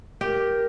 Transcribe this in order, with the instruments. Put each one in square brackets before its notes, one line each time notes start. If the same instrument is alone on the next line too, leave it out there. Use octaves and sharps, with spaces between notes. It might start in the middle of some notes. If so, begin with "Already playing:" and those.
[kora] G4 [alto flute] A#4